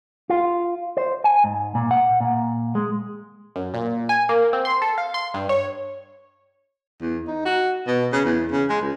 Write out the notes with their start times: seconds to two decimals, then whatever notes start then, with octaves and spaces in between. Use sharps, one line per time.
0.30 F4
0.97 C5
1.24 G#5
1.44 G#2
1.75 A#2
1.91 F#5
2.20 A#2
2.75 G#3
3.56 F#2
3.74 A#2
4.09 G#5
4.29 A#3
4.53 C4
4.65 C6
4.82 A4
4.98 F5
5.14 C6
5.34 G2
5.49 C#5
7.01 E2
7.27 D#4
7.45 F#4
7.87 B2
8.12 C#3
8.25 E2
8.51 C#3
8.69 G#3
8.82 C#2